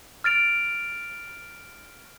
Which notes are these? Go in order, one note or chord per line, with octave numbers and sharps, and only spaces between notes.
F6 A6 D7 F7